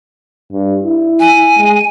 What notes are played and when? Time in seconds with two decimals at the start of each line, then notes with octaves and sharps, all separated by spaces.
0.53 G2
0.83 E4
1.20 G#5
1.58 G#3